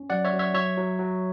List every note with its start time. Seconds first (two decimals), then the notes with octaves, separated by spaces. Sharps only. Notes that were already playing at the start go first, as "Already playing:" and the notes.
Already playing: C#4
0.10 F#3 D5 F#5
0.25 C#5 E5
0.33 F#3
0.39 C#5 E5
0.54 F#3 C#5 E5
0.77 F#3
0.99 F#3